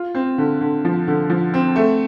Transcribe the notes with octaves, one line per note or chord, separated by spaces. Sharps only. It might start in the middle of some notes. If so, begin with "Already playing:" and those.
Already playing: F4
C4
D3
D3
F3
D3
F3
C4
A3